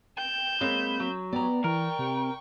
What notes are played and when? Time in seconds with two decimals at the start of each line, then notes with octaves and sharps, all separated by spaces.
0.18 G5 G6 E7
0.61 G#3 A#3 C4 C#5 B5
1.00 F#3
1.33 B3 G4 D5 A#5
1.64 E3 A#4 G5 C#6
1.99 C3